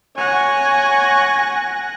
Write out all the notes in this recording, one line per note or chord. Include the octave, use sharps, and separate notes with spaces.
C#5 F#5 G#5 A#6